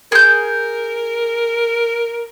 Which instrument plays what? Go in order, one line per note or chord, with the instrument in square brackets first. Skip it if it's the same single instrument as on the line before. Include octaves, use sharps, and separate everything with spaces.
[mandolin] G#4 G6 [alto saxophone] A#4